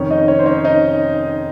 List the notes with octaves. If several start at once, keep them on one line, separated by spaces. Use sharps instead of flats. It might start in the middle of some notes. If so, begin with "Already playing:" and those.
Already playing: F1 F2 D#3 C#4 C#5
D#4 D#5
C#4 C#5
C5
C#4 C#5
D#4 D#5